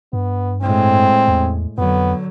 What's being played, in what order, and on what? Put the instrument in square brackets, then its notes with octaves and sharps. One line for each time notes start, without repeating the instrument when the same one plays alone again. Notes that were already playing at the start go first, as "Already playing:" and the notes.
[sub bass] G2 [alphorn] B3
[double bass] A2 G#3 [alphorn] C4
[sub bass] E2
[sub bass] F2 [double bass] D3 F#3 [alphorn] B3